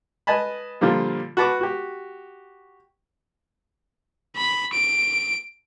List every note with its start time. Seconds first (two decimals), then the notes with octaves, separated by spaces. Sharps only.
0.27 B4 D#5 G#5 A5 B5
0.81 A#2 D3 F3 G3 F4
1.37 F#4 B4 A5 B5 D6
1.61 F#4 G4
4.37 B5
4.73 D7